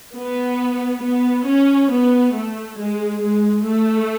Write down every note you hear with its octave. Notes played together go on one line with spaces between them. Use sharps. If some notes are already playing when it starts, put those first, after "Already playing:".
B3
B3
C#4
B3
A3
G#3
G#3
A3